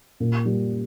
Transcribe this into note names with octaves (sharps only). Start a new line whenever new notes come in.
A#2
G3